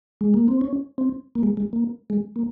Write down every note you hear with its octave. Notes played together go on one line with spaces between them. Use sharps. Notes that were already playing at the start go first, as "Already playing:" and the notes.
G#3
A#3
C4
C#4
C4
A#3
G#3
G#3
A#3
G#3
A#3